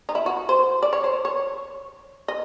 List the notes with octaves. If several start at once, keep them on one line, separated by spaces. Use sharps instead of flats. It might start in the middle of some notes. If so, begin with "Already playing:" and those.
D#4
E4
F#4
C5
D5
C#5
C5
C#5
D#5